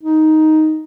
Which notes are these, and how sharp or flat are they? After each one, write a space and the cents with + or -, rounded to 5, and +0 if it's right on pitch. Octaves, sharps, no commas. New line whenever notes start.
D#4 +5